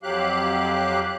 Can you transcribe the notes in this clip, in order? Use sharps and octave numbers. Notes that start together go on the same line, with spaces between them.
F2 F#3 G4 F5 F#6